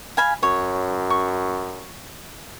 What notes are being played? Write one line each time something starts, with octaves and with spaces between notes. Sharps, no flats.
F5 G#5 B5
F#2 C#5
C#6